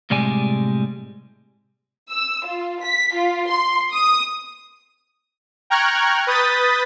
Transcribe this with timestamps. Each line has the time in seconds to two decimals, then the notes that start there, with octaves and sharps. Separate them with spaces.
0.10 A2 C3 G3 G#3 D5 G#5
2.10 E6
2.46 F4
2.83 B6
3.15 F4
3.49 C6
3.93 D#6
5.70 G5 A#5 C#6 F6 F#6 G#6
6.27 B4 D#6 G6 A6 B6